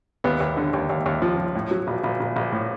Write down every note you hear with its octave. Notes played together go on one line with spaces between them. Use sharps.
D#2 B3
D#2
D3
D#2
D#2
D#2
F3
F3
A2
F#3
A#1
A#1
A#1
A#1
A2